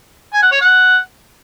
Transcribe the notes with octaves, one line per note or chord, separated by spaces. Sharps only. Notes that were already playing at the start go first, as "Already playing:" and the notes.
G#5
F#5
C#5
F#5